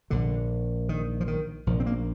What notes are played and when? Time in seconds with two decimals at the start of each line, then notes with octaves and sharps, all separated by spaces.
0.10 A#1 A#2 D3
0.89 D#3
1.21 F3
1.28 D#3
1.67 A#1 A#2 F3
1.80 C4
1.86 A#3